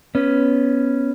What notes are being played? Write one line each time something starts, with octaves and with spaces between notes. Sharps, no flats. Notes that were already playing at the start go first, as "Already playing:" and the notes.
B3 C#4